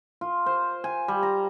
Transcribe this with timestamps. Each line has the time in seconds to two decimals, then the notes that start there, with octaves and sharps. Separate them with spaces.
0.21 F4
0.46 C5
0.84 G#5
1.08 G3
1.23 A#5